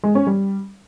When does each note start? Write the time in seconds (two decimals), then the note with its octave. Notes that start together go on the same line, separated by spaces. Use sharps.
0.04 G#3
0.15 C#4
0.27 G3